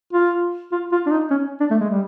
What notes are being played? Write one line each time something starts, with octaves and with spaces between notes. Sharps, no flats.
F4
F4
F4
D4
D#4
C#4
D4
A3
G#3
G3